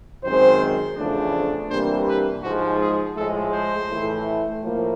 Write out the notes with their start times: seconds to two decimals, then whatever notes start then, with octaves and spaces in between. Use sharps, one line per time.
0.23 F#2 D#3 G#3 C4 C5
0.96 E2 C#3 F3 A3 D4
1.69 C3 E3 G3 A#3 D4 C5
2.07 B4
2.42 G#2 F3 G#3 F#4
2.79 G#4
3.16 A2 F3 G#3 A4
3.52 C5
3.89 A2 E3 A3
4.62 A2 F3 A#3